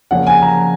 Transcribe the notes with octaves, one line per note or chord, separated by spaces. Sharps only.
C#3 F3 A#3 C#4 F#5
G#5
A#5